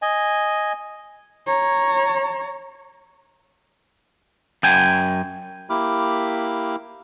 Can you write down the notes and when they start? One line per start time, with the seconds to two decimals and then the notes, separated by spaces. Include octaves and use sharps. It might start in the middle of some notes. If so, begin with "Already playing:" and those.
0.02 D#5 G#5
1.47 C#5 A#5
4.63 F#2 G5 G#5
5.70 A#3 E4 G4 B5 D6 F6